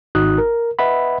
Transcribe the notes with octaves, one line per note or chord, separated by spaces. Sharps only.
G#1 D#4 F#4 D#6 F#6
A#4
B4 D#5 E5 F#5 B5